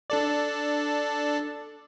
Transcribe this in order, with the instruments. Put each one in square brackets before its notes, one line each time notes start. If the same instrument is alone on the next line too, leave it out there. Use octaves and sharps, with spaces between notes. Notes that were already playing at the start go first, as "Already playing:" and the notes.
[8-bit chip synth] D4 A4 D5